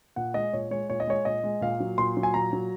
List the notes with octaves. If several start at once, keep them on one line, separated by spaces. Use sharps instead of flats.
A#2 F#5
G#3 D#5
A#2 C#5
G#3 C#5
A#2 C#5
D#5
G#3 C#5
A#2 D#5
G#3
A#2 F5
F#3
A#2 C6
F#3
G#5
A#2 A#5
F#3